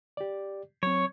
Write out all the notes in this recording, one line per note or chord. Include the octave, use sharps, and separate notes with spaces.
G4 D5
F#3 C4 C#5